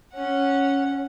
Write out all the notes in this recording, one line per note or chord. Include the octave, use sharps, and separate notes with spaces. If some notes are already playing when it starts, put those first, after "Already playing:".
C#4 F#5